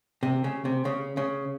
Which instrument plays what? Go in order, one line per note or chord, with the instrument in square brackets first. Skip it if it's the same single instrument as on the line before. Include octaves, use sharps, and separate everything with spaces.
[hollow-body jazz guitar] C3
C#3
C3
C#3
C#3